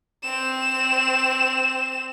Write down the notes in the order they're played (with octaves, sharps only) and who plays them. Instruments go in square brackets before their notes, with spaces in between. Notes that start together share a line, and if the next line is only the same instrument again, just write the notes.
[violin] C4 E7